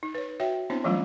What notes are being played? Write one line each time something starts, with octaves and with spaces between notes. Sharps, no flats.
D#4
B4 C#5
F#4 C#5 E5 G5
B3 C4 D4 E4 C5 C#5
E3 F#3 G3 A3 C#4 F4